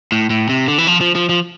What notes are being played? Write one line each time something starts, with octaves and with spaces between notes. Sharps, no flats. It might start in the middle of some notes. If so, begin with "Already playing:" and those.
A2
A2
C3
D3
E3
F3
F3
F3
F3